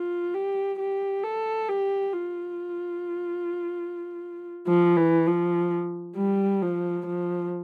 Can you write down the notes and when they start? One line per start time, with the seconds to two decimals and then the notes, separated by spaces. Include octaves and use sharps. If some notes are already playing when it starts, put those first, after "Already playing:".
Already playing: F4
0.34 G4
0.79 G4
1.24 A4
1.68 G4
2.13 F4
4.67 F3
4.97 E3
5.27 F3
6.17 G3
6.61 F3
7.07 F3